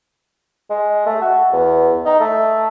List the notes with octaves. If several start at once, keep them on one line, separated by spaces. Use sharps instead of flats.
G#3
A3
F#4
E2
D#4
A3